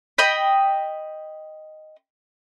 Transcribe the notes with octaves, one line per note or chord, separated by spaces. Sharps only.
D#5 G5 B5